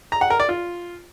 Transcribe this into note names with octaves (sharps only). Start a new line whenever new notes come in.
A#5
F#5
A#4
D5
F4